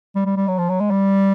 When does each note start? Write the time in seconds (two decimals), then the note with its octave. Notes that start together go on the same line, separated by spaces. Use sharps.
0.15 G3
0.26 G3
0.37 G3
0.48 F#3
0.58 F3
0.70 F#3
0.80 G#3
0.91 G3